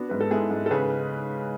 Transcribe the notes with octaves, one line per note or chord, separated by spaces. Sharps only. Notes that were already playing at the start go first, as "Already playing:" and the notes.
Already playing: B3 D4 F#4
G#2 B4
A4
G#3 E4 G#4
G#2
A4
C#3 G#4 B4